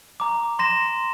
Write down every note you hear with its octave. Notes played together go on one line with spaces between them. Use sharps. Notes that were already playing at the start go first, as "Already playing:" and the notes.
A#5 D6
C6 A#6 E7